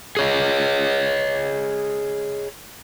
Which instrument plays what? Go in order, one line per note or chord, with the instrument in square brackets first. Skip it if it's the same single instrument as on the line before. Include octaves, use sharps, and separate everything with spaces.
[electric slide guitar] G#4 C#5 D#5